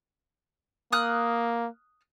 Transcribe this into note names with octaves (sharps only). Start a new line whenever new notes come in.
A#3 D#6 F6 F#6